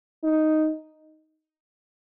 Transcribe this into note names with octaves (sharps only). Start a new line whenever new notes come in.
D#4